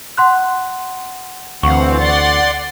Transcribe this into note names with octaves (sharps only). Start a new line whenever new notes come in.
F#5 C6 F#6
D2 E3 C4 F5 F#5 C#6
D5 F#5 C6 A6